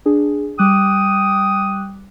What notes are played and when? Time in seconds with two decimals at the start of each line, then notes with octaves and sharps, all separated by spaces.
0.06 D4 G#4
0.59 G3 G5 D6 D#6 F#6